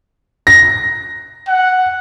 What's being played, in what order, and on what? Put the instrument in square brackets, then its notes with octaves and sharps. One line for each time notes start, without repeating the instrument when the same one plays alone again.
[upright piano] A#6
[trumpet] F#5